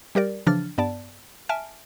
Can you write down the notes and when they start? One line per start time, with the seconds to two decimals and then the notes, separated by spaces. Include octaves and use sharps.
0.15 G3 G4 A#4 D5
0.47 C#3 E3 F3 D4 F6 A6
0.78 G2 B3 D5 A5
1.49 E5 G#5 A5 F6 D7